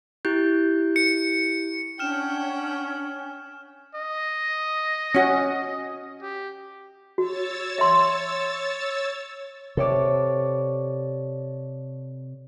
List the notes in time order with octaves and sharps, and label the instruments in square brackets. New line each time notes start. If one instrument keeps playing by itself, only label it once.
[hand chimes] E4 G4 G6
[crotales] C#7
[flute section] C#4 [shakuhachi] D4 [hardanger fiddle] F#5 G5 [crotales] F6 E7
[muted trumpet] D#5
[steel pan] C#4 F#4
[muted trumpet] G4
[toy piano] F#4 [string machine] C#5 E6 A6
[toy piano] E5 C6
[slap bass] C3 [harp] A4 C#5 D5